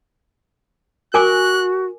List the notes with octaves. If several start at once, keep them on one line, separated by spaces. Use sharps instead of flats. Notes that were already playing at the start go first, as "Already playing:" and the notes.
F#4 A#4 G#5 D6 F#6